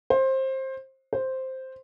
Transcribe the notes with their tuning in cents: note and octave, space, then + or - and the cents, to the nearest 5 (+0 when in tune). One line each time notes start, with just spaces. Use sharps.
C5 +20
C5 +0